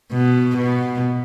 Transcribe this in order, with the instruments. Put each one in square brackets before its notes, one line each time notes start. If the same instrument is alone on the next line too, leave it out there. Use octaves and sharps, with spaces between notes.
[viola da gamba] B2
B2